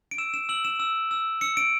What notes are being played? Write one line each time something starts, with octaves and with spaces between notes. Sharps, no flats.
D7
E6 E7
E7
E6 F#7
E7
E6
E6
E6 C#7
D7